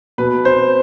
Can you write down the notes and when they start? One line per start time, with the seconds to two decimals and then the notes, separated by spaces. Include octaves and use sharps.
0.18 B2 B4
0.45 C4 C5